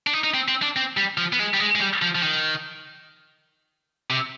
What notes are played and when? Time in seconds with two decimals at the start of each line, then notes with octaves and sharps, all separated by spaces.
0.07 D4
0.13 D#4
0.24 D#4
0.34 C4
0.48 C4
0.62 D4
0.76 C4
0.97 G3
1.18 F3
1.33 B3
1.39 G#3
1.54 G3
1.60 G#3
1.75 G#3
1.81 G3
2.02 F3
2.15 F3
2.22 D#3
4.10 C3